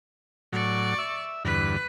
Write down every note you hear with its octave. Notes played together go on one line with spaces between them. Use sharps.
A2 F#3 D5 C#6
E5
E2 G2 D3 B4